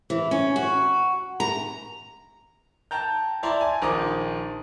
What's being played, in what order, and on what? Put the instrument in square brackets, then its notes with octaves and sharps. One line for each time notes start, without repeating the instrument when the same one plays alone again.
[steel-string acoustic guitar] E3
C#4
F#4
A#5
[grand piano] G5 A5 A#5 G6
E4 D5 A5 A#5 C6
G#5
A#1 D#3 C5 A#5 D6 D#6